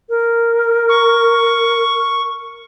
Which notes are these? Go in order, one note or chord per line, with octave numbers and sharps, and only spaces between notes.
A#4
C#6